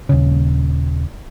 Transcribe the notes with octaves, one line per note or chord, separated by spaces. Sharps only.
D#1 C#3